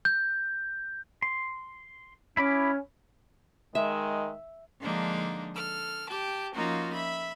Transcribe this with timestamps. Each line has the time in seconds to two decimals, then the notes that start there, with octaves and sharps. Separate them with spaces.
0.05 G6
1.22 C6
2.37 C#4 E4 B5 D6
3.75 D#3 G#3 E5
4.80 D3 F3 G#3 A#3 D4 D#4
5.54 A4 F6
6.09 G4 G5 A5
6.54 F3 A#3 C#4 D#4 F4 F#4
6.94 E5 B5